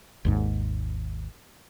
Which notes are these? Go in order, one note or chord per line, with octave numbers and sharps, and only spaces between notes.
G#1 D#2 G#2